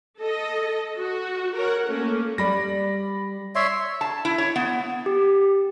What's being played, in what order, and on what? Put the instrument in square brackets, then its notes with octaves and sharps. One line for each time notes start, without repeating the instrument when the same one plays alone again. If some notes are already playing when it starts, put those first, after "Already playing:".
[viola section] A4 D#5
F#4
A#4 C#5 F#5
A3 A#3 C#4
[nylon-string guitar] G3 [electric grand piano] D5 B5 A#6
[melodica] C#5 E5 C6 [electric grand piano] D5
[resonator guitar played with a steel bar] A5
E4
C#5
B3
[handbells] G4